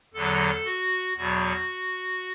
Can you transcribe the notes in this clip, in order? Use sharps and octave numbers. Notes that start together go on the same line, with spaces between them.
E2 D3 F#3 A4
F#4
E2 B2 F#3 F#4